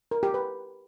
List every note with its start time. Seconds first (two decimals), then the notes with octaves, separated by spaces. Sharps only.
0.11 A#4
0.23 G4
0.34 B4